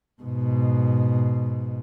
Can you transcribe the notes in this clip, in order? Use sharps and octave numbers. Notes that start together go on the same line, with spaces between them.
G#2 B2